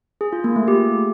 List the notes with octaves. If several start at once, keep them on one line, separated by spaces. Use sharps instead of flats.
G#4
F4
A#3
A3
G4